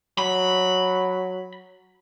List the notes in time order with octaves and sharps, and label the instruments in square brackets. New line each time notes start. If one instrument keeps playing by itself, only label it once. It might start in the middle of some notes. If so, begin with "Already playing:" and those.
[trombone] F#3 [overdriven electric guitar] B5